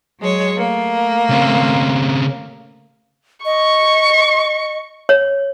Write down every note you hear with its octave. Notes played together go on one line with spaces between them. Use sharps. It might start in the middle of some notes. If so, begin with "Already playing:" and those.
F#3 G#3 C#5
A3 A#3
C#3 C4
D#5 C#6
C#5